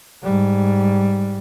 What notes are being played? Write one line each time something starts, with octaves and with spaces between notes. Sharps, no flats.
G#2 G3